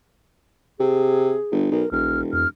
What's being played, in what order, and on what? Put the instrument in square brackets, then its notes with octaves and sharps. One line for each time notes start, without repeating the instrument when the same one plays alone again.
[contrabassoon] C3 [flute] G#4
[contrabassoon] G1
[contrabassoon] B1 [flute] A#4
[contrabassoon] E1 [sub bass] A#1 [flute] F6
[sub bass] F2 [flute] F6